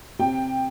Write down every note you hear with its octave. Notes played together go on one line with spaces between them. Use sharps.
C3 G5